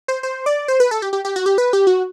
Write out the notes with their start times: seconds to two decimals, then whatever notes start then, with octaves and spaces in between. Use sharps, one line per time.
0.08 C5
0.23 C5
0.46 D5
0.68 C5
0.80 B4
0.91 A4
1.02 G4
1.13 G4
1.25 G4
1.36 F#4
1.46 G4
1.58 B4
1.73 G4
1.87 F#4